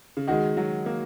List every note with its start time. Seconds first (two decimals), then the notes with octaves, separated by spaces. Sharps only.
0.17 C#3
0.27 D#3 G#3 F#4
0.57 F#3
0.86 A#3